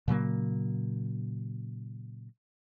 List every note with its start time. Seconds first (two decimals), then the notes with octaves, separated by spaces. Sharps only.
0.08 A#2 C#3 F#3 A#3